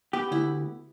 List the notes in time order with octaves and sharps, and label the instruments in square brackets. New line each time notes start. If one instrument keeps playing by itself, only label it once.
[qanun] B3 [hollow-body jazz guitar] G4
[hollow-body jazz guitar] D2 [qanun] E4